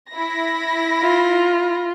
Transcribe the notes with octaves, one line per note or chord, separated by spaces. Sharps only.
E4 B5 A#6
F4